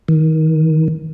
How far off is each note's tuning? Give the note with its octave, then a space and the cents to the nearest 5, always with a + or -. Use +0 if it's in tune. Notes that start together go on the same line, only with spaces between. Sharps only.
D#3 +25